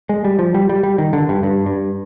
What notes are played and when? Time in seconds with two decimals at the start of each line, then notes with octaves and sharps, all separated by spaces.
0.09 G#3
0.25 G3
0.39 F3
0.55 G3
0.69 G3
0.83 G3
0.98 D#3
1.13 D3
1.29 G2
1.43 G2
1.66 G2